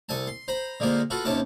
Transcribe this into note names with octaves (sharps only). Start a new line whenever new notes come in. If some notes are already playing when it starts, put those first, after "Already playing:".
C2 A4 G#5 A5
C6
C5 A#5 B5
D3 G#3 A#3 F4 C5
F4 F#4 A4 B4
D#2 C3 C#4 A5 D6